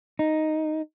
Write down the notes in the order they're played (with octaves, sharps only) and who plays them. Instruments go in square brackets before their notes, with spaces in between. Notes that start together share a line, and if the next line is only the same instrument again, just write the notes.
[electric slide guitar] D#4